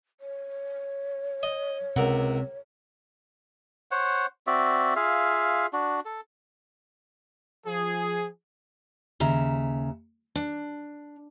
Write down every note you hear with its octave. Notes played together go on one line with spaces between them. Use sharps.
C#5
D#5
C#2 C3 A#4 F#5
C5 C#5 F#5
C4 F#4 D5 E5
F4 G#4 E5 F5
D4 F#4
A4
F3 G#4
D#2 C#3 E5 A#5
D4